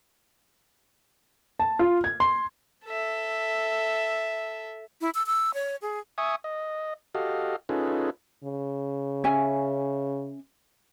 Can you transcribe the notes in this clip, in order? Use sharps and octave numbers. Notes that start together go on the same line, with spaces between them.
A5
F4
G#6
C6
A4 E5
E4
E6
E6
C#5
G#4
E5 G#5 C#6 D#6
D#5
F#4 G4 A4 D#5 F5
C#4 D#4 F4 G#4 A4 B4
C#3
C#4 E5 G#5